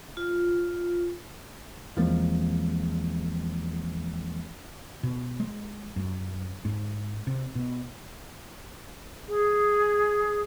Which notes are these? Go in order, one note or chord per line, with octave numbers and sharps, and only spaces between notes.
F4
E2 E3 F3 G#3 A#3 C4
B2
G#3
F#2
G#2
C3
B2
G#4